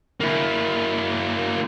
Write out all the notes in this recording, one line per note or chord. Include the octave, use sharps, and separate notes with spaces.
A#3 E4